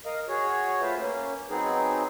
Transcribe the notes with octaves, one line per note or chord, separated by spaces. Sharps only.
A#4 D#5 F5
F#4 G#4 C#5
A3 F4 B4 C5 E5
A#3 C#4
F#3 B3 C4 D#4 G#4